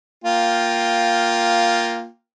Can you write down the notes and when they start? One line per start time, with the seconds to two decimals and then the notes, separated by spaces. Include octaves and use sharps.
0.24 A#3 F4 G5